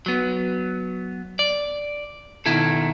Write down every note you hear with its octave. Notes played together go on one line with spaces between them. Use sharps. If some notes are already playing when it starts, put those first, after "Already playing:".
F#3 B3
D5
B2 D#3 E4 A4